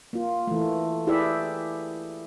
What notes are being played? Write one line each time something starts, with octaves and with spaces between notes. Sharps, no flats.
A#3 F4
E3 A3
E4 G4 G#4 B4 D5 E5